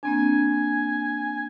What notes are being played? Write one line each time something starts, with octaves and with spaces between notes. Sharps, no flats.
A#3 C4 D4 G#5